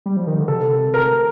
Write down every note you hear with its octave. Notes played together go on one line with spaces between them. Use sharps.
G3
F3
D#3
D3
C3 A4
A#4